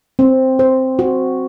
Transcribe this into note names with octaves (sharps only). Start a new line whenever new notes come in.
C4
C5
F#4